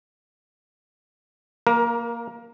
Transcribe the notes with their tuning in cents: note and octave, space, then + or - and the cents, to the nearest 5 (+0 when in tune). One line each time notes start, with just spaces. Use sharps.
A#3 +0 A#4 +25